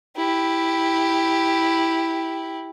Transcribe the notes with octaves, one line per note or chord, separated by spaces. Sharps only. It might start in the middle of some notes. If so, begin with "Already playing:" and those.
E4 G4